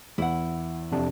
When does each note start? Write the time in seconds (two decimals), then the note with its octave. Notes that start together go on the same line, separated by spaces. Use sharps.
0.18 E2 E4 F#5
0.92 F2 C3 D4